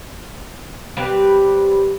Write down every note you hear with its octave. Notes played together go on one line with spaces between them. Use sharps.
G3 C4 G4 B4